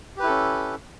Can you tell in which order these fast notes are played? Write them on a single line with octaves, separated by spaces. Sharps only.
G4 B4 E4 A4 C#4